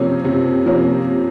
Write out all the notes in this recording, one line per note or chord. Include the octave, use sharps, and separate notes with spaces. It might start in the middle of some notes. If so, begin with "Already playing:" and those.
Already playing: C3 F3 A#3 C#4
C3
F3 A#3 C#4